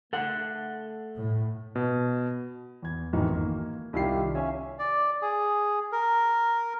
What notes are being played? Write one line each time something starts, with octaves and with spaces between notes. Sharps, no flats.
A3 A4 F#5
A2
B2
E2 G#6
A1 F2 G#2 D#3 E3 F#3
A#3
C2 D#3 E4 F4 G4 C7
C#4 E5 G#5
D5
G#4
A#4